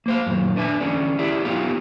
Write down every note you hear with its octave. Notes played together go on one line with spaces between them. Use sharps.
A#3 C5 F5
F#2 A#2 D#3
D4 B4 E5 G#5
E2 D3 C#4 G#4 D5
E4 G4 G#4 D5
B3 D#4 F4 G4 F5